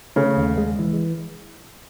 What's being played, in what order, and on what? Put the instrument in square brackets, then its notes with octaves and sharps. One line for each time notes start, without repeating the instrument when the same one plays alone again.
[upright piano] C#3 [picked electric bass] A3
[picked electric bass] D#2
G#3
E3